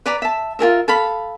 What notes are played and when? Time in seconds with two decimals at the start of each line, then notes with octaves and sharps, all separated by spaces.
0.06 B4 D5 A#5 B5
0.22 E5 A5
0.59 F4 G#4 A#4 E5
0.88 A4 F5 B5